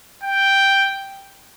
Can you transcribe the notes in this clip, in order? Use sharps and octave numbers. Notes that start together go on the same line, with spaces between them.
G5